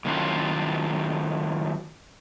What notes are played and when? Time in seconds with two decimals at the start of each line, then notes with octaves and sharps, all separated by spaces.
0.05 A2 D#3 F#3 C#4 F4